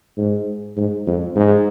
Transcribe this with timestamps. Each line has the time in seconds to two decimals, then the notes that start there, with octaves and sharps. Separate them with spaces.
0.18 G#2
0.77 G#2
1.07 F2
1.36 G#2